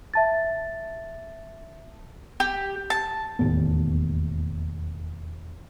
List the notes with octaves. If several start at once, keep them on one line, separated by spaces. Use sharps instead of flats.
E5 A5 A6
G4
A5
E1 D#2 A2 B3